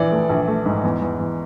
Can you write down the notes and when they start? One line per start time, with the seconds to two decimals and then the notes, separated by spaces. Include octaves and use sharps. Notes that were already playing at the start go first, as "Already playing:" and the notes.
Already playing: A#1 E3 D5
0.12 A3
0.29 A#1
0.48 A3
0.66 G#2
0.84 E2
1.02 E2
1.19 E2